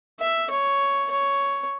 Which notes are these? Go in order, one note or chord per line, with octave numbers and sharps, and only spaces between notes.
E5
C#5
C#5